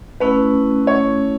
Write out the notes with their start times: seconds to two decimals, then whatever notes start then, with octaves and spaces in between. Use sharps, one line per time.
0.20 A3 C#4 E4 B4
0.87 C#5